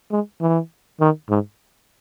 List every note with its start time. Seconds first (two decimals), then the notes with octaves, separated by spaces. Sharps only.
0.11 G#3
0.41 E3
1.01 D#3
1.30 G#2